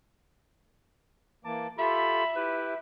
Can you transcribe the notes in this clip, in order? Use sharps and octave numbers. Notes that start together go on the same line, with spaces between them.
E3 A#3 A5 D6
F4 G4 A4 E5 B5
E4 G4 B4